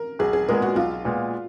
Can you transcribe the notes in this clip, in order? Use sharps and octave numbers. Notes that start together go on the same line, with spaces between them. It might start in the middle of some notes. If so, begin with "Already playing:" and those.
Already playing: A#4
B1 G#4
G#4
A#2 G#3 B3 A#4
F#4
B1 F4
A#2 G#3 B3